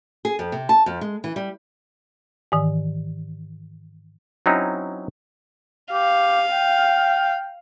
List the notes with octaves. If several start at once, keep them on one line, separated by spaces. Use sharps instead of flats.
G#4
F2
C3
A5
F2
G#3
E3
G3
G#2 D#3 E3
F#3 C4 C#4 D#4 E4
G4 F5
G5